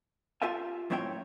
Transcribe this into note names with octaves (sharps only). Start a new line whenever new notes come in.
F4 G4 A4 E5 F5 G#5
F#2 A2 C4 C#5 E5 G5